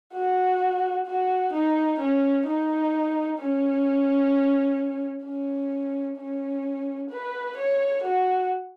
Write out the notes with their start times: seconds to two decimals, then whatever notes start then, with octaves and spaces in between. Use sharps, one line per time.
0.14 F#4
1.07 F#4
1.53 D#4
2.00 C#4
2.47 D#4
3.39 C#4
5.25 C#4
6.18 C#4
7.10 B4
7.57 C#5
8.04 F#4